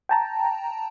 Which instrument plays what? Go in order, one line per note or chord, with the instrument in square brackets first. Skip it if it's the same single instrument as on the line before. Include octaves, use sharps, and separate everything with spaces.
[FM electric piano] G5 A5 A#5